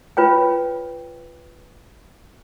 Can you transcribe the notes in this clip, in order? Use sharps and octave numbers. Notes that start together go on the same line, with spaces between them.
F4 B4 C#5 G5